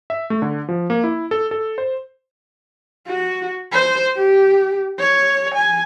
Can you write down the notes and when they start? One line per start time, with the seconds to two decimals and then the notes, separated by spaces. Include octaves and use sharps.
0.10 E5
0.30 A3
0.42 D3
0.69 F3
0.90 A#3
1.04 E4
1.31 A4
1.51 A4
1.78 C5
3.07 F#4
3.72 C5
4.16 G4
4.99 C#5
5.54 G#5